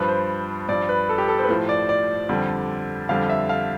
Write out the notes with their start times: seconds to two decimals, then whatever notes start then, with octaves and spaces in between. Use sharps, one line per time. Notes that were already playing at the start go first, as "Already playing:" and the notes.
Already playing: G2 F3 B4
0.08 C5
0.69 G2 F3 D5
0.89 B4
1.09 A4
1.18 G4
1.28 A4
1.39 C5
1.43 B4
1.49 A2 F3 C5
1.69 D5
1.89 D5
2.29 F2 D3 G3
3.09 F2 D3 G3 F5
3.29 E5
3.49 F5